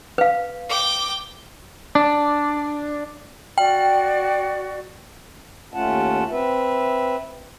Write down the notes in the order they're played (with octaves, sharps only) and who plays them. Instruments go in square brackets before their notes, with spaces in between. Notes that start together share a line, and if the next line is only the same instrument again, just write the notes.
[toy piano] B4 F5
[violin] G5 D6
[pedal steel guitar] D4
[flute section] F#4 D5 [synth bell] G5
[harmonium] D#2 A3 C#4 F4 F#5 A5
C4 B4 E5